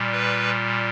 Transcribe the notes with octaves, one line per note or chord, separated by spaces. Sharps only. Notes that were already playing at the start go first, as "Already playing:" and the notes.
Already playing: A#2 G3
B4